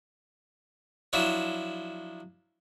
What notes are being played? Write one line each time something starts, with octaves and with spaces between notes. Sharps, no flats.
F3 F#3 D4 E4